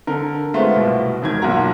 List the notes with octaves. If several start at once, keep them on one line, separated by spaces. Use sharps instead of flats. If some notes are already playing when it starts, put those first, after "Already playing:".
D3 A#4
G#3 A3 B3 C4 F4
C2 B2
E1 D#3 G#6
B1 A#2 F#4 A#5